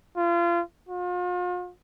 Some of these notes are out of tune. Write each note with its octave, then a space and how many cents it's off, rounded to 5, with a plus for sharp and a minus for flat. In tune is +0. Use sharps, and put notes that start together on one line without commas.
F4 -30
F4 +40